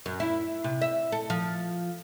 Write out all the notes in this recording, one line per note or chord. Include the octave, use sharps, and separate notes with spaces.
F#2
E4
C3
E5
A4
F3